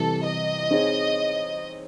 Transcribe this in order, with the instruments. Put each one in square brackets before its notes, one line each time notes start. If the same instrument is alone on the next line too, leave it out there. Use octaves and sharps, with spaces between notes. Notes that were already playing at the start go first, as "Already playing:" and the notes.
Already playing: [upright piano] C3 E3 G3 [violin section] A4
[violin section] D#5
[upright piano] C4 D#4 G#4 C#5